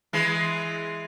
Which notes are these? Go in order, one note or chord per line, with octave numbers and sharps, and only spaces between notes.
E3 G#3